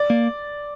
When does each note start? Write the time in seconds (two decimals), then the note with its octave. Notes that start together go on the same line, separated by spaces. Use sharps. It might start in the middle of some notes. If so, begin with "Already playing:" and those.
Already playing: D5
0.10 A#3